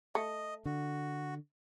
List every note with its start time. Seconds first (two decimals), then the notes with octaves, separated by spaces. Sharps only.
0.15 A3 D#5
0.65 D3 F#4